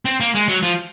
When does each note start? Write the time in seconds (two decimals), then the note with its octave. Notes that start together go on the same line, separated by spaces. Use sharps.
0.05 C4
0.20 A#3
0.35 G#3
0.48 F#3
0.62 F3